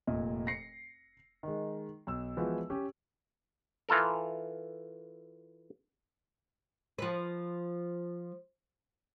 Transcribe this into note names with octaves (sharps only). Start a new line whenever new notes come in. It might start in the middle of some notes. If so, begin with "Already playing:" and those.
F1 A#2 D#5
A#6 C7 C#7
D#3 G#3
B1 E6
E3 F3 G#3 B3 E4 F#4
C#4 G4
E3 F4 A4 A#4
F3 B4